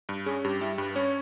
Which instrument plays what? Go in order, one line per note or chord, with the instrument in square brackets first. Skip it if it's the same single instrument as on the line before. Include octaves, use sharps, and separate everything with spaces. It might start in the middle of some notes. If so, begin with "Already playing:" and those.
[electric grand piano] G2
[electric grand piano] C#4 [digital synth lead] G#4
[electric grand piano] G2 [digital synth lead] G4
[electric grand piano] G3 [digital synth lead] E4
[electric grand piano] G2 [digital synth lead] B4
[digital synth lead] B4
[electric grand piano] C#4 [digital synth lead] C#5